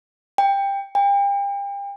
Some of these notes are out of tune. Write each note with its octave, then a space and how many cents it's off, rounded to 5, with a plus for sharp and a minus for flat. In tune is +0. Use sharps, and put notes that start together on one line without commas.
G5 +15
G5 +35